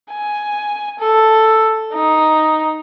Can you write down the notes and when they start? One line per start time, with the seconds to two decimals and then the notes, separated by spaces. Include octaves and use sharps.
0.11 G#5
0.99 A4
1.94 D#4